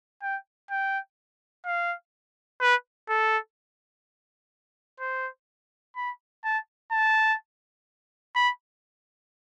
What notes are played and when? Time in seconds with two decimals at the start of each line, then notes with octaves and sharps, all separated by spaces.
0.22 G5
0.70 G5
1.65 F5
2.61 B4
3.09 A4
5.00 C5
5.96 B5
6.44 A5
6.92 A5
8.35 B5